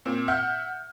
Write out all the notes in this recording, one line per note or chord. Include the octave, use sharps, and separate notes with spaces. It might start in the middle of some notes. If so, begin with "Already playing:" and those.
A#2 C4
E5 F#5 F6 G6